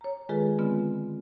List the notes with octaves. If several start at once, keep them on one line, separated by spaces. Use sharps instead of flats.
C#5 A#5
D#3 G#3 F4 G#4 A4 B4
D3 G#3 B3 C4 F4